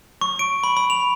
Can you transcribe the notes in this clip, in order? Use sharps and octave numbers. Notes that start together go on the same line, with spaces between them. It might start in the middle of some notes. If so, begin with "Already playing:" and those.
C#6
D7
B5
B5
F7